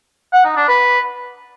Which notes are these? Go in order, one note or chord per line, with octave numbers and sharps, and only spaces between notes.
F#5
D#4
D4
B4